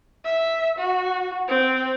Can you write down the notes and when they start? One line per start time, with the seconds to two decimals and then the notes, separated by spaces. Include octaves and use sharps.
0.25 E5
0.79 F#4
1.48 C4